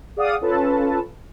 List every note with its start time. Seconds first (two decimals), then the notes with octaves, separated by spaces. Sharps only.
0.17 G#4 D5 F5 F#5 D#6
0.41 C#4 F4 A4 B4 A5